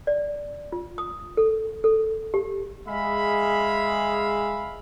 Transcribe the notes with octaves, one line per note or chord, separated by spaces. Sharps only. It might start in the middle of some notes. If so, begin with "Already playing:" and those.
D5
F4
D#6
A4
A4
G4
G#3 G#4 E5 F5 B5